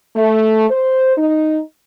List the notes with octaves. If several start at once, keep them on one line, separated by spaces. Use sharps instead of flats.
A3
C5
D#4